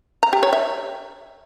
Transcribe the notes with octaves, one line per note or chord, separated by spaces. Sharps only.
A#5
G4
C#5
E5